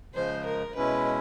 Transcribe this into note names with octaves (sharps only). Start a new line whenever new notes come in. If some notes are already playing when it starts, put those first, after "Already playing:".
C#3 F3 G#3 C5
A#4
B2 G#3 C#4 E4 B4